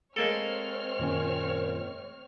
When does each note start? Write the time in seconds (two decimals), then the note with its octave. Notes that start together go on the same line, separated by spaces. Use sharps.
0.16 G#3 A#3 C4 A4 C#5 F6
0.99 F#2 A#2 D#3 C#4